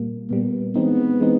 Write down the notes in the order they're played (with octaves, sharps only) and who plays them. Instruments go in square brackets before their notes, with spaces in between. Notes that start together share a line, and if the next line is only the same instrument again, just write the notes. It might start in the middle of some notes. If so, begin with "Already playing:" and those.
Already playing: [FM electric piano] A#2 G3 A#3
[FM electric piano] A#2 G3 A#3 [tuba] B3
[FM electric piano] E3 G#3 C4 D#4 [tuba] B3
[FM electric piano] E3 G#3 C4 D#4